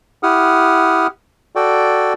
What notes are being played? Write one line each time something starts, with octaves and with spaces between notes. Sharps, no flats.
E4 G4 F#5 D#6 F6
F#4 A4 D5 G5